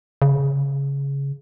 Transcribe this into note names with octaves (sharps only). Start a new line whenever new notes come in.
C#3